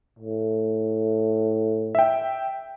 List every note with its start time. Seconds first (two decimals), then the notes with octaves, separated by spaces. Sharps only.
0.19 A2
1.95 E5 G5